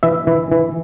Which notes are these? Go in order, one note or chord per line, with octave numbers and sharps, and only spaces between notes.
E3 E5
E3
E3